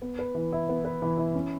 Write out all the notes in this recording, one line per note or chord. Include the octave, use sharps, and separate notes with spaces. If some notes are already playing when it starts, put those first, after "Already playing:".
B3
B4
E3
E4
B3
B4
E3
E4
C#4